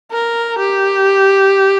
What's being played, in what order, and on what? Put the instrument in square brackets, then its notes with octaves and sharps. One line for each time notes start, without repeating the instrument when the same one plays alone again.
[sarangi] A#4
G4